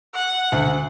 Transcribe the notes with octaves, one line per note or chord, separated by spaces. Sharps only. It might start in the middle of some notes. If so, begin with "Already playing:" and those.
F#5
D2